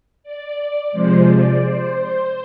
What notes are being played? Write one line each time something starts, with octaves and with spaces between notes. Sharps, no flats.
D5
C3 F3 G#3 C5
D5
C5
C5